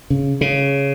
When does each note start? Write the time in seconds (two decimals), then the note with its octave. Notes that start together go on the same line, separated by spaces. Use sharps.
0.10 C#3
0.41 C#3